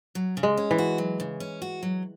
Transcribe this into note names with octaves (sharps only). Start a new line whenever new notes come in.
F#3
C#3
G#3
C#4
E3
F#4
F#3
C#3
C#4
F#4
F#3